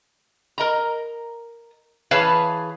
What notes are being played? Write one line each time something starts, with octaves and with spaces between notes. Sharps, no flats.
A#4 D#5 A#5
E3 G#4 B4 C#5 F5 A5